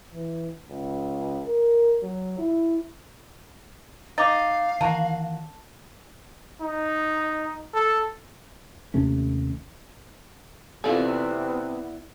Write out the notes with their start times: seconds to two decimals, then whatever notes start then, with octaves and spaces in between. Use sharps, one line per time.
0.12 E3
0.69 C#2
1.46 A#4
2.03 F#3
2.38 E4
4.18 D#4 F5 D6 A6
4.81 D#3 E3 A#3 F#4 A5
6.61 D#4
7.74 A4
8.94 D#2 C3 A3 C#4
10.84 C3 B3 E4 F4 A4 D5 G#5